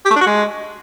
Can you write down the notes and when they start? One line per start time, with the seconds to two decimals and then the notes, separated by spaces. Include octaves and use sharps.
0.05 G4
0.11 A3
0.16 D4
0.21 F#4
0.26 G#3